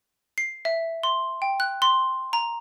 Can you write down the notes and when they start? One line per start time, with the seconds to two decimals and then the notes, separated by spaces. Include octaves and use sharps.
0.38 C7
0.65 E5
1.03 C6
1.42 G5
1.60 F#6
1.82 C6
2.33 A#5